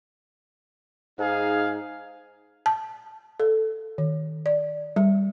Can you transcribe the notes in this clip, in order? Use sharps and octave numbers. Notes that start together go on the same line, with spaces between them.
G#2 D#4 G#4 F5
A5
A4
D#3
D5
G3